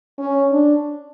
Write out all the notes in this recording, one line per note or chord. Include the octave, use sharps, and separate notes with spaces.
C#4
D4